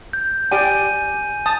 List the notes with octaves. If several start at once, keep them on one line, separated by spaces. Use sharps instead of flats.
G6
G4 D5 G5 G#5 D#7
A5 D#6